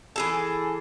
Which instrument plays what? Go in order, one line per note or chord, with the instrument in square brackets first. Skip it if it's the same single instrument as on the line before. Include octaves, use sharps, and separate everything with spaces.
[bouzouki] E3 G#4 A4